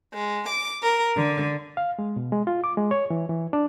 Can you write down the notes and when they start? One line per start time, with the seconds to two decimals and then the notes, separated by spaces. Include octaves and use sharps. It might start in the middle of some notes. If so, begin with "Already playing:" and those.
0.14 G#3
0.49 D6
0.82 A#4
1.17 D3
1.77 F5
1.99 G#3
2.16 B2
2.32 G#3
2.47 F4
2.64 D6
2.77 G#3
2.91 C#5
3.10 E3
3.29 E3
3.53 D4